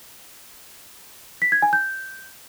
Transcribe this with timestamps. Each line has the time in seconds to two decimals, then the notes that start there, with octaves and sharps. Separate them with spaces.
1.42 B6
1.52 G#6
1.62 G#5
1.73 G6